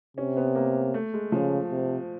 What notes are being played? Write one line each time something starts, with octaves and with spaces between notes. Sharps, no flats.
C3 C#4
B3
A#3
A3
G#3
C#3 F3
C3